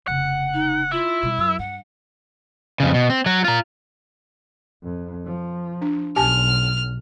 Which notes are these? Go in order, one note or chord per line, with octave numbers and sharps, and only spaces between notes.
F1 C#3 F#5
D#4
E4 F4
B2 G3
F#2 E6
G2 F#5
F2 C#3
B2
C4
F#3 F#4
F4 A#5
F2
F3
D4
B1 G4 G#5 A5 F6